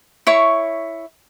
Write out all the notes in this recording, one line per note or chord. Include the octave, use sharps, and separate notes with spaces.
E4 C#5 C#6